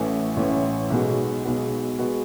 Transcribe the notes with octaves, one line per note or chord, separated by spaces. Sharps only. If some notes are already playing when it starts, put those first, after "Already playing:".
Already playing: A1 A2 E3 A3 C#4
A1 A2 E3 A3 C#4
B1 B2 G#3 B3 F#4
B1 B2 G#3 B3 F#4
B2 G#3 B3 F#4